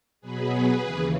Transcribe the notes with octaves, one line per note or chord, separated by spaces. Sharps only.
B2 F#3 B3 G#4 B4
D#2 C#3 E3